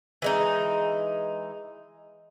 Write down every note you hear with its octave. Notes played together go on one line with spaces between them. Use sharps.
E3 G#3 D#4